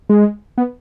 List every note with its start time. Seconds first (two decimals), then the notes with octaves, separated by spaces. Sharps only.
0.10 G#3
0.58 B3